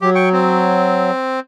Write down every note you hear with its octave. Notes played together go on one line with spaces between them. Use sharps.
F#3 G4
G5 C#6
C4